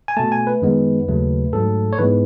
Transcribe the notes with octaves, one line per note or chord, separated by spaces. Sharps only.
G#5
B2 A3 A5
G#5
B4
F#2 D#3 G#3 B3
D#2 C#3 F#3 A3
G#2 F#3 A3 A4
C#5
G#2 E3 G#3 B3 B4